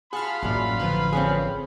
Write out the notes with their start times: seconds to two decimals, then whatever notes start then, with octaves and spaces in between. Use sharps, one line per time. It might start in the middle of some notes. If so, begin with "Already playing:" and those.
0.13 F4 G#4 F5 F#5 A5 B5 F6
0.43 A1 F#2 A#2
0.80 D3 F3 B4
1.13 C4 C#4 G#4